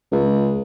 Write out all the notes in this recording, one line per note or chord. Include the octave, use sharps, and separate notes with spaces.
C#2